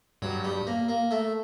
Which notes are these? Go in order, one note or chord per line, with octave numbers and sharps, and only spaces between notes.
G2 F#3
G3
A#3
A#3
A3